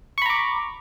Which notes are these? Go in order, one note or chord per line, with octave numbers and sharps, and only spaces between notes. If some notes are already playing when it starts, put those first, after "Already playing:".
A#5 B5 C#6 D6